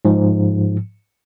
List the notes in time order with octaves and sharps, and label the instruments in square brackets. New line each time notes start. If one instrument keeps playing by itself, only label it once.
[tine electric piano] G#2 F3